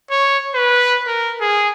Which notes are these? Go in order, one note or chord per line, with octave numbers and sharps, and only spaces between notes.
C#5
B4
A#4
G#4